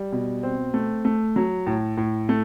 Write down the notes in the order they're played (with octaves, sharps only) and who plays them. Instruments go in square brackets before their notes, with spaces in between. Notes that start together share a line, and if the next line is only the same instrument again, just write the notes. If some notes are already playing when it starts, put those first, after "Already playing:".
Already playing: [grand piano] G3
B2
C4
A3
A3
F#3
A2
A2
A3